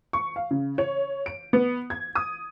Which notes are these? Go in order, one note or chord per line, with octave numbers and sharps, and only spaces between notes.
C#6
F5
C#3
C#5
D7
B3
G#6
D#6